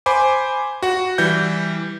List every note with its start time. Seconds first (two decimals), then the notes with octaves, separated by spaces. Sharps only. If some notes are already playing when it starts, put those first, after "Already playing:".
0.06 C5 G#5 B5 D6
0.83 F#4 F#5
1.18 E3 G3 G6